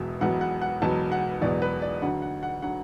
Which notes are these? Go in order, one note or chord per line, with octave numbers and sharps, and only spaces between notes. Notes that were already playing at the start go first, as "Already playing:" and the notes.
Already playing: E1 E2 B2 F#3 E5
E1 E2 B2 F#3 F#5
F#5
F#5
E1 E2 B2 F#3 A5
F#5
E1 E2 B2 F#3 D5
B4
D5
D2 D3 F#3 F#5
F#5
F#5
D3 F#3 F#5